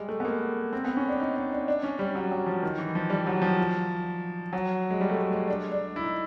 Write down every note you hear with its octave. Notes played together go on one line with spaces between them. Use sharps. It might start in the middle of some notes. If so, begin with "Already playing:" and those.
Already playing: G3 G#3
A3
B3
A#3
C4
B3
C#4
D4
D#4
D#4
D4
D4
C#4
G3
F#3
F#3
F3
D#3
E3
F3
G3
F#3
F3
F#3
G#3
G3
A3
G#3
G#3
D4
D4
E4
D#4